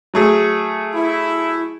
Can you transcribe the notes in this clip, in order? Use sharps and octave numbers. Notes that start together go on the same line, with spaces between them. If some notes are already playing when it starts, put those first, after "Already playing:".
F#3 A3 G#4
E4